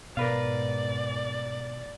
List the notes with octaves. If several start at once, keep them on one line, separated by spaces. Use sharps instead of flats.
G#2 B2 A#4 B4 D5 F5